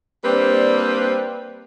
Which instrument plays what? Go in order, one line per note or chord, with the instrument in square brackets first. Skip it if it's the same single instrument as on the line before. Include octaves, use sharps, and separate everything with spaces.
[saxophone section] G3 A#3 C4 D4 B4 C5